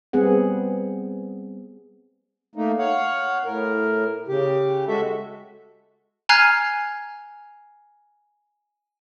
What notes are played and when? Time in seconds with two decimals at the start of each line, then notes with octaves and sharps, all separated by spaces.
0.13 G3 B3 C4 G#4 F#5
2.56 A3 A#3 D#4
2.78 C#5 F5 F#5
3.45 A2 A#4
4.28 C#3 G4
4.88 G#3 F#4 A4 E5
6.29 G#5 A#5 F6 F#6 G#6 C7